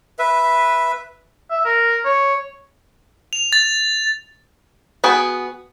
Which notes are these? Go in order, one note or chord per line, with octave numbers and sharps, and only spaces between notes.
B4 E5
E5
A#4
C#5
F7
A6
B3 F#4 G#4 G5